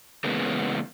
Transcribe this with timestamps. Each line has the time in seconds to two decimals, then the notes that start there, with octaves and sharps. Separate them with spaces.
0.24 C#3 E3 G#3 A#3 B3